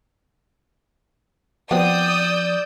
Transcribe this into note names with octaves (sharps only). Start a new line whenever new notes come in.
F3 B3 C4 D5 D#6 E6 G6